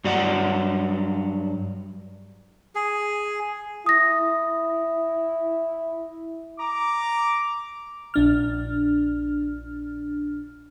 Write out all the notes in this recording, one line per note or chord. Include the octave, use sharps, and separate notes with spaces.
G2 F#3 D5 F#5
G#4
E4 D#6 A#6
A#5 D6
A#1 D4 F6